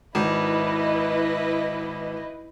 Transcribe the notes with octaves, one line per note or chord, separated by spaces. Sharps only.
G#1 E4 B4 D#5